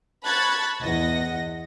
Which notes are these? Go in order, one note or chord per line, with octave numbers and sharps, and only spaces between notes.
A5 B5 C#6 F#6 G#6 A6
E2 D#5 F#5 A#6